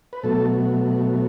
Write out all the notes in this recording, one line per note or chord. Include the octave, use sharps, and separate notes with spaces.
B4
B2 F#3 A3 A4